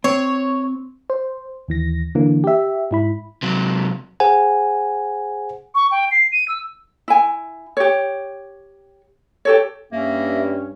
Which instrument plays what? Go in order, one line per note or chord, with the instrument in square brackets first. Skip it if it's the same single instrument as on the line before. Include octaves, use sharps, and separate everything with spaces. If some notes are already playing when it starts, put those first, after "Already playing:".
[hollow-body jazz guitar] C4 [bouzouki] C#5
[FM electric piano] C5
D#2 E3 A#6
D3 E3 A#3
G4 E5
G#2 E4 B5
[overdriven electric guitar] C3 F#3
[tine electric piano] G#4 C5 F#5 G#5
[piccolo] C#6
G5
C7
D#7
E6
[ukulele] E4 G#5
G4 C#5
G4 A4 C#5
[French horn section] G2 [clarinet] A#3 [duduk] C#4 [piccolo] E5